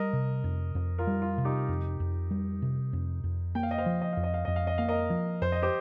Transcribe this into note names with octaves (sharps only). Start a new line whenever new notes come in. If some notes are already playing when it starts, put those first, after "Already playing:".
Already playing: G3 A#4 D#5
C3
F2
F2
F4 A#4
G3
F4
C3
D#4 G4
F2
F2
G3
C3
F2
F2
A#3 G5
F5
D#5
C5 F5
F3
D#5
F2 F5
D#5
F5
F2 D#5
F5
D#5
A#3 F5
A#4 D#5
F3
F2 C5
D#5
G4 C5